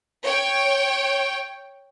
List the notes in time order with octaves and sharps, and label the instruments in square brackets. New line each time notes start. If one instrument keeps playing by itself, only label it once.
[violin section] C#5 G5